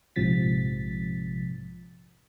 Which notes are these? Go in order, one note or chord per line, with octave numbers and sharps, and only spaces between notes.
A#1 G#2 C3 F3 A6 B6